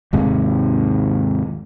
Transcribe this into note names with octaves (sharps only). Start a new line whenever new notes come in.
D#2 G#2 C3